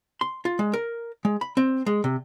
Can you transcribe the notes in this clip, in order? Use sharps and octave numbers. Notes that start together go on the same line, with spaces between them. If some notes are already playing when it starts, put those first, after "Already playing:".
C6
F4
G#3
A#4
G#3
B5
C4
G#3
C3